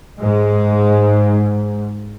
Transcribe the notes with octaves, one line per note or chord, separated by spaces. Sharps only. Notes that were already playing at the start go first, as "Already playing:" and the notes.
G#2 G#3